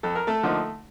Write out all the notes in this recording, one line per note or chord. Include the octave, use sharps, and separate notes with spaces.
F2 A4
A#4
A3 A4
D3 F3 A#3 D#4